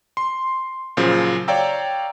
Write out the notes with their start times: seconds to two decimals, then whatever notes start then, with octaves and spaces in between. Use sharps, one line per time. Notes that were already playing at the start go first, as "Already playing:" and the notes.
0.17 C6
0.97 A#2 C#3 F3 F#3
1.48 C#5 D5 F5 G5 A#5 E6